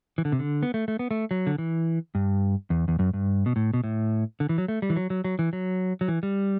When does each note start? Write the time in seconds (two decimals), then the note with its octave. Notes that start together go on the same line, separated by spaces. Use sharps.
0.18 E3
0.25 D3
0.32 C3
0.39 D3
0.63 B3
0.74 A3
0.88 A3
0.99 B3
1.11 A3
1.31 F#3
1.47 D3
1.58 E3
2.15 G2
2.70 E2
2.88 E2
2.99 F#2
3.13 G2
3.46 B2
3.56 A2
3.74 B2
3.84 A2
4.40 D3
4.49 E3
4.58 F#3
4.68 A3
4.82 G3
4.90 E3
4.96 F#3
5.10 F#3
5.24 F#3
5.39 E3
5.53 F#3
6.01 F#3
6.08 E3
6.23 G3